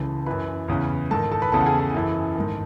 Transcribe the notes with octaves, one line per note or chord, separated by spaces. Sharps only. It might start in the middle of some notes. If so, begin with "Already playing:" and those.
Already playing: C#2 C#3 E3 A4 A5
F#2 E3 B4 B5
E2 C#3 E3
G#2 D#3 A4 A5
A4 A5
B4 B5
E2 C#3 E3 A4 A5
F#5
G#4 G#5
A4 A5
F#2 E3
G#2 D#3